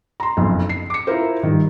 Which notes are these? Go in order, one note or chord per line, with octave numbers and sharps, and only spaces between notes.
A#5 C6
F#1 B1 F2
C7
D6 C#7
E4 F4 A#4 C5
G2 D#3